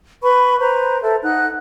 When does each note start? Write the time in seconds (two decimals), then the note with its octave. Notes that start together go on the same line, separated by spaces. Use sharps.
0.22 B4 B5 C#6
0.60 B4 C5 A#5
1.02 A4 C5 E5
1.23 D#4 F#5 F#6